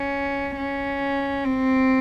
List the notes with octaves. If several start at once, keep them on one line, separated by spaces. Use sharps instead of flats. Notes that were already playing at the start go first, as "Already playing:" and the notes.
Already playing: C#4
C#4
C4